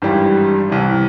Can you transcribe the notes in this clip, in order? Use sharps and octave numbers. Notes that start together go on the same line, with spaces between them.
G#1 G2 E3 G3
C2 C3 E3